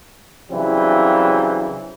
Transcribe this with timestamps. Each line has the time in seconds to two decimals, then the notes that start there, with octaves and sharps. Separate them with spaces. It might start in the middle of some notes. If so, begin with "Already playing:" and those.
0.51 C#3 E3 F#3 G3 C4 D4